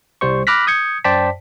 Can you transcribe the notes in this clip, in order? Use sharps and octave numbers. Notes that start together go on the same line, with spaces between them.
C2 G3 C5 C#6
B5 D6 F6 F#6 A#6 B6
D#6 G6 G#6 C#7
F#2 C5 D5 G5 A5 B6